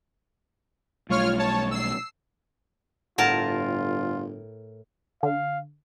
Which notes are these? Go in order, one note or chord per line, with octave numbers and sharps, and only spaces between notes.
B1 G3 A3 F4 C#5 F6
C#5 A5
E6 C7
G1 A2 F4 A#4 F#5 A5
D3 F5